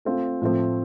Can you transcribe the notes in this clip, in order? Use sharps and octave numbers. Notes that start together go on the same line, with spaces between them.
A3 C4 F4
A2 F3 A3 C4